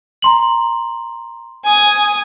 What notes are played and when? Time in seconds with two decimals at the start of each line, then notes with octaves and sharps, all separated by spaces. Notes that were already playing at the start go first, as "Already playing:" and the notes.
0.22 A#5 C6 F#7
1.65 G#5 D#6